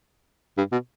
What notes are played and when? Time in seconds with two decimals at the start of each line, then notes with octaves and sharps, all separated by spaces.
0.57 G2
0.72 B2